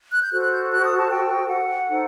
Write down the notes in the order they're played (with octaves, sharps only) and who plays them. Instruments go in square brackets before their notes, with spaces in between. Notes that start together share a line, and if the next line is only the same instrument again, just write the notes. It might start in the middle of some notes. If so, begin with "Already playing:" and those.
[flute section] F#6
G6
F#4 A4 C5 F#6
F#6
G6
F#6
D#6
A5
G5
F#5
D#4 A4 C5